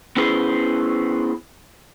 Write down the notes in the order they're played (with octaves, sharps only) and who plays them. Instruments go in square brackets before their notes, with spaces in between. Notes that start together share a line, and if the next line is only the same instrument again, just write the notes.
[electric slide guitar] B3 C#4 E4 G#4 B4 C5